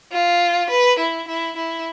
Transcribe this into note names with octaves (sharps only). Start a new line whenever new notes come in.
F4
B4
E4
E4
E4